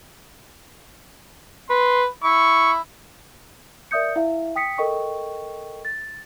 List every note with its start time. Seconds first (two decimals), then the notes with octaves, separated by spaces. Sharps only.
1.70 B4 C6
2.24 E4 C#6
3.91 A#4 D5 E5 D#6 G6 C#7
4.16 E4 E5 F5
4.56 G5 D#6 B6 C#7
4.78 A4 A#4 D#5 G5 C#6
5.85 A6